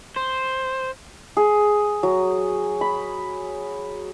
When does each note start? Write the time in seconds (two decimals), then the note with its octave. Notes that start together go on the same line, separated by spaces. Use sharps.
0.16 C5
1.37 G#4
2.03 F#3
2.81 B5